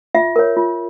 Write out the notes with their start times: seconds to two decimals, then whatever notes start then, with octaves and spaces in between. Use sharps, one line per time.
0.15 F4 E5
0.36 A#4 C#5
0.57 F4